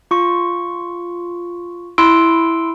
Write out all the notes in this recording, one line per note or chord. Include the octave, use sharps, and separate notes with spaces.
F4 C#6
E4 C6 E6 D7